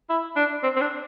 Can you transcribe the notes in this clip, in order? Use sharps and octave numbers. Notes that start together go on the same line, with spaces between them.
E4
D4
C4
C4
D4